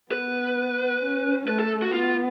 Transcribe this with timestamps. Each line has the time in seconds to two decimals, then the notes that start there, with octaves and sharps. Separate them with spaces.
0.11 B3 B4
1.02 C#4
1.48 A3 B4
1.60 A4
1.82 F#4
1.93 B3 F4